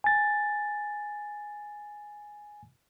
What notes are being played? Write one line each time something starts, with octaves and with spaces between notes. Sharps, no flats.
G#5 A6